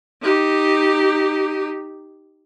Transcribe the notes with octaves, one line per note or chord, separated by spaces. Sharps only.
D#4 G4